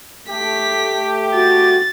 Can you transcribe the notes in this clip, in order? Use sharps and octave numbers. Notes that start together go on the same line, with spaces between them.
A3 G4 B6
F#4 A6